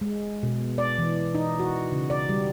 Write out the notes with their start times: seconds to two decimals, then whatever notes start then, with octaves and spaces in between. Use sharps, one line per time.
0.01 G#3
0.43 B2
0.78 D5
0.99 E3
1.35 D#4
1.60 F#4
1.92 C#3
2.10 D5
2.29 G3